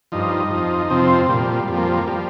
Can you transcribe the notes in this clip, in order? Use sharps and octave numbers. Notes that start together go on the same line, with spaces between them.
G2 F3 D#4
F2 F3
F2 C3 F3 C4
A#2 F3 G3
F2 F3 G3
A#3
G3
A#3
F3 G3